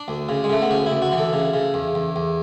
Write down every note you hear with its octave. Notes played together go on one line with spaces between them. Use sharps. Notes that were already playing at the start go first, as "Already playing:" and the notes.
Already playing: D4
D2
C#3
G#3
C#3 A3
B3
D2 C#4
E4
D2
F#4
E3
A4
C#3
C#3
E2
E2
E2